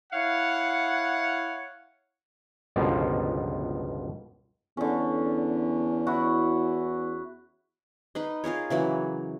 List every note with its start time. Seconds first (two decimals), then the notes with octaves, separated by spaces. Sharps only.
0.13 E4 C#5 F5 F#5
2.76 G1 C#2 B2 F3 A#3
4.77 E2 D3 C#4
6.07 E4 F#4
8.15 D#4 B4 D#5
8.44 F4 G#4 A#4 C#5
8.70 C#3 E3 F#3 A#3